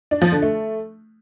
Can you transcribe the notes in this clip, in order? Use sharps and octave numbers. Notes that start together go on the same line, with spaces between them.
D4
F3
D3
A3